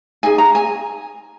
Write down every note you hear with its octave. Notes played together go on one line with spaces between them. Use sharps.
D#4 G#4 G#5
A#5
G#5